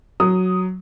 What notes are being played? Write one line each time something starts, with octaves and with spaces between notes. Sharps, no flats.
F#3 D#6